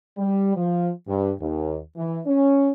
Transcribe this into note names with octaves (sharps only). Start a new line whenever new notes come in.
G3
F3
G2
D#2
E3
C#4